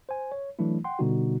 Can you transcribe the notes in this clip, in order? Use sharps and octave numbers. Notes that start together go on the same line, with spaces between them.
C5 G#5
C#5
E3 F#3 A3 D4 E4
F#5 G5 C6
B2 D3 G3 B3 D#4 F#4